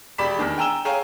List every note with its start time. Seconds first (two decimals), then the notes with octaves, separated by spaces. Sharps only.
0.18 E1 G4 D5 B5 B6 E7
0.37 E2 D#3 D4
0.58 G5 G#5 A#5 E6 E7 G7
0.85 G#4 C#5 F5 G5 G#5 A#5